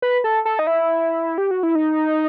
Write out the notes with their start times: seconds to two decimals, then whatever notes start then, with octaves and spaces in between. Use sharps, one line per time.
0.02 B4
0.24 A4
0.45 A4
0.59 D#4
0.67 E4
1.38 G4
1.51 F#4
1.63 E4
1.75 D#4